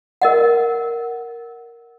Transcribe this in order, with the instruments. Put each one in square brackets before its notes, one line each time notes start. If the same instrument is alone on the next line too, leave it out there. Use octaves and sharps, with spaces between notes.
[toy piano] A#4 D#5 F#5